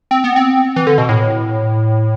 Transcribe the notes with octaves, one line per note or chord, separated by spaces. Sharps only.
C4
B3
C4
E3
D3
B2
A2